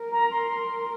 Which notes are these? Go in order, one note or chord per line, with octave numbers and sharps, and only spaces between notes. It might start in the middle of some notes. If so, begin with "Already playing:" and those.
Already playing: A#4
A#5
C6